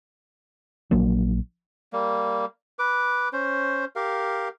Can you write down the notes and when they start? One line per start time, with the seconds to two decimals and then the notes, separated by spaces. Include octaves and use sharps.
0.91 A#1 F#3 A#3 D4
1.93 G3 A#3
2.79 B4 D6
3.33 C#4 C5
3.96 G4 A#4 F5